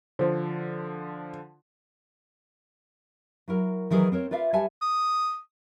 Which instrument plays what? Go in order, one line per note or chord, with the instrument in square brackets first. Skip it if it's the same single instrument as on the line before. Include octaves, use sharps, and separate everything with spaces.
[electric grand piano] D3 F3 [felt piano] C5
[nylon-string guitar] F#3 E4 A#4
D#3 E3 F#3 G#4 A#4 B4
C4 A#4 C#5
F4 B4 D5 E5 F5
G3 A4 B4 E5 G#5 A5
[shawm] D#6